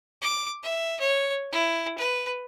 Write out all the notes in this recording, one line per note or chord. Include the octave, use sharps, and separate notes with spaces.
D6
E5
C#5
E4
B4